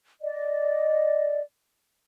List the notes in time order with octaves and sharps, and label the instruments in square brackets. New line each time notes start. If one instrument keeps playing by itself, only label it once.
[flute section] D5 D#5